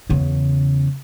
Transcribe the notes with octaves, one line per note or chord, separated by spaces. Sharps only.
E2 C#3